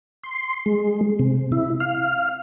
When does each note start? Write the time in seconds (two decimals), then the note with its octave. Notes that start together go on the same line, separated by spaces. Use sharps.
0.24 C6
0.66 G#3
1.19 C3
1.52 E4
1.80 F5